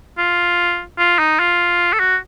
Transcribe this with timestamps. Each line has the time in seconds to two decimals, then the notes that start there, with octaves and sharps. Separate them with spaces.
0.18 F4
0.99 F4
1.19 D#4
1.39 F4
1.93 A4
2.00 F#4